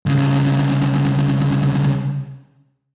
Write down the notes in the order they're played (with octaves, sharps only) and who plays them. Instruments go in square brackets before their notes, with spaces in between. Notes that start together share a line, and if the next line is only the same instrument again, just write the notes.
[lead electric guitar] C2 C#3